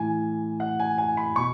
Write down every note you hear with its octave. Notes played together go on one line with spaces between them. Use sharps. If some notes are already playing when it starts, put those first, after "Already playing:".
Already playing: A2 E3 G#5
F#5
G#5
G#5
B5
B2 C#6